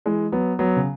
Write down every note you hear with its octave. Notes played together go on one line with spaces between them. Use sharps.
E3 G#3
F#3 B3
F#3 B3
C#3